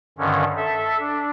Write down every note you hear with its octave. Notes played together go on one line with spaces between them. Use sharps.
G2 D3 D#3 C#4
A4 E5
D4